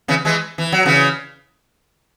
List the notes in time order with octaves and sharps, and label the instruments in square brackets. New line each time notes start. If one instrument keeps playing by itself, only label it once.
[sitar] C#3 E3
E3 G#3
E3
F#3
C#3 E3